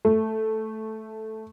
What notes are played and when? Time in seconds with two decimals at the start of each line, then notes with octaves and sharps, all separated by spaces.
0.05 A3